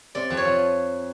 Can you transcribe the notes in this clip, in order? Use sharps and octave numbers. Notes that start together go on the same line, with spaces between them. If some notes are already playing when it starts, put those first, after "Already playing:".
C3 D5
F2
C#5
F3